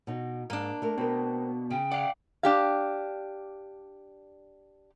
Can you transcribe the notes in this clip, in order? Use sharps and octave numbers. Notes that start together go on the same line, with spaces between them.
B2 D#4
G#2 A#3 D4
A3 A#4
B2 C4 A#4
C#3 G5
D5 F5 F#5
D4 G4 F5